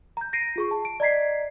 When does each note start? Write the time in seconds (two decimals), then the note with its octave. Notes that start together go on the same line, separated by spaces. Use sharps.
0.17 A#5 G6
0.33 A#6 C7 D7 D#7
0.56 F4 G#4 C#6
0.71 A5
0.85 D7
1.00 D5 D#5 A#5 G#6 B6 C7